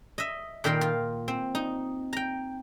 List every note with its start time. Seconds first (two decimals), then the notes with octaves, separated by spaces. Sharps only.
0.18 D#5 E5
0.64 A#2 D#3 A#4 G5 C6
0.81 F4
1.28 C4
1.55 D#4
2.13 G5 A#5